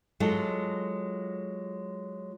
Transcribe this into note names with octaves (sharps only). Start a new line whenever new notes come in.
F#3 G#3 F4 A4